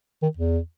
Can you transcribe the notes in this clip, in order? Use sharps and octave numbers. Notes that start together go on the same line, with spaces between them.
D#3
E2